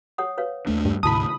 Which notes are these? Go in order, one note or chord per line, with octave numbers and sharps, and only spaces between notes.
C#5 F#5 D#6
B4 C#5 F5
D#2 A3 D4
G2
D2 G#2 C3 E4 A5 B5 D#6